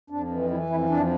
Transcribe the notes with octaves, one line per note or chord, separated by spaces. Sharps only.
F2 D4
E3
E3 E4
F2 E4
F2 D4